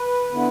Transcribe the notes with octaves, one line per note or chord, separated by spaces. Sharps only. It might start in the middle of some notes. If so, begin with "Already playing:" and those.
Already playing: B4
D3 B3 E4